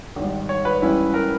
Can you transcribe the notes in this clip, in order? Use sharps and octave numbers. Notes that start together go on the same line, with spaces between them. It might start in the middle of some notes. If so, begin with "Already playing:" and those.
G#1 G#2 D#3 G3
C#5
B4
G#2 E3 G3 C#4 E4
A#4